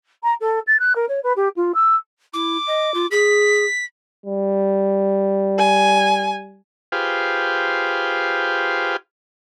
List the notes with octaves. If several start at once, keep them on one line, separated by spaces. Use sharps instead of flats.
A#5
A4
A6
F#6
A#4
C#5
B4
G4
F4
E6
E4 D6
D#5
F4
G#4 B6
G3
G#5
F4 G4 G#4 B4 C5 F5